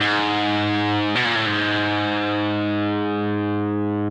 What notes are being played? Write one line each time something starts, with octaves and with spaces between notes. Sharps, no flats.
G#2
B2
A#2
A2
G#2